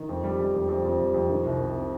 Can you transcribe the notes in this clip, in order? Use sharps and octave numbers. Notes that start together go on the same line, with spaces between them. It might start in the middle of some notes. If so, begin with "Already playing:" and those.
Already playing: D#3
F2
G3
G3
F2
F2
F2
G3
F2
D#3
C2
C3
C4